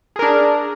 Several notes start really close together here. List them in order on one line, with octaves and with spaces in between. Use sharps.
G#4 A#4 D4